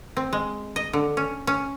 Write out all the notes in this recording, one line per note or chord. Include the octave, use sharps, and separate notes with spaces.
C4
G#3
D#5
D3
C#4
C#4